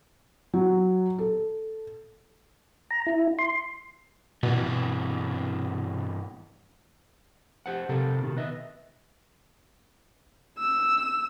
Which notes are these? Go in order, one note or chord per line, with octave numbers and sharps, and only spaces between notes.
F#3
A4
A#5
E4
C6
G2 B2 E3 B3
G4 C5 F#5
C3 G4 A4 A#4
B2 D#3
B4 D#5 E5
E6